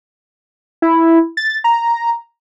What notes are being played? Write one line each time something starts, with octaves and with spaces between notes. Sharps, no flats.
E4
A6
A#5